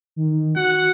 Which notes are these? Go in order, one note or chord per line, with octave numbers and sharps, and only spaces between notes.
D#3
F#4 F#5